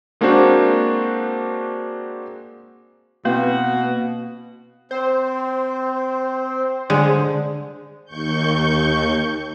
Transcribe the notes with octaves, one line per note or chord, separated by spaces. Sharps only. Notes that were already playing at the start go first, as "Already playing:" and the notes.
G#3 A#3 C4 D4 F#4 C5
B2 A#3 C4 E4 F#4 B4
C4 C5
D3 G#3
D#2 C#6 G6